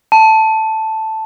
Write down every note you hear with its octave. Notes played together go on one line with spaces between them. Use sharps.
A5